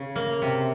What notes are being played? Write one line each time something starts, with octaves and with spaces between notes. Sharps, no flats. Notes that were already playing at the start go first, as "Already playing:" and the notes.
Already playing: C#3
A#3
C3